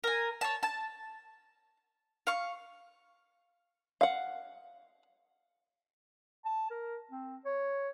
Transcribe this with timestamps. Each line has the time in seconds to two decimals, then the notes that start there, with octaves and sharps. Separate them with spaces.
0.04 A#4 G#5
0.41 C#5 A5
0.63 A5
2.27 F5 C#6
4.01 F5 F#5
6.45 A5
6.70 A#4
7.11 C4
7.45 C#5